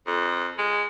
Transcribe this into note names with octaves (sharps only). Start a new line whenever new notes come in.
F2
G#3